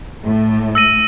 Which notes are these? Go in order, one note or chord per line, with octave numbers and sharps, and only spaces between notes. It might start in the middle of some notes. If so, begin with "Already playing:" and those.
A2
E6 A#6 D#7